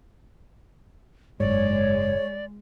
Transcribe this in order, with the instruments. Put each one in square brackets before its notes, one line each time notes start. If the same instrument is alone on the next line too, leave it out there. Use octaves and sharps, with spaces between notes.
[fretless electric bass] F#1 G#2 [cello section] G#3 [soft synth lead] C#5 [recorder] D5